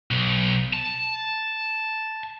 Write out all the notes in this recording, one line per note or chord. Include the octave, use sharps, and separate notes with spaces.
B1
A5